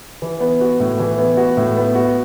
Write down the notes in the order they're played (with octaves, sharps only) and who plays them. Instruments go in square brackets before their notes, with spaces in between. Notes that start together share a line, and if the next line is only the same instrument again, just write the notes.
[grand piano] E3
B3
F#4
A2
E3
B3
F#4
A2
B3
F#4